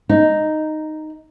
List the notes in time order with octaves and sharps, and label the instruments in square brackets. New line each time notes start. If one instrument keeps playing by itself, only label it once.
[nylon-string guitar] D#4